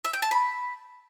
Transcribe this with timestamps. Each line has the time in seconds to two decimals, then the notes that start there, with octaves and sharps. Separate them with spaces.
0.05 E5
0.13 G5
0.22 A5
0.31 B5